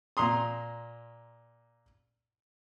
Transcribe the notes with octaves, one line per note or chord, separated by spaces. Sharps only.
A#2 A#5 C6 D#6